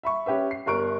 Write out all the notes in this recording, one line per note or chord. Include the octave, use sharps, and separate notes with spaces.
E5 B5 C#6
C#4 G4 B4 E5
C7
G1 G3 A#4 C#6 F#6 D7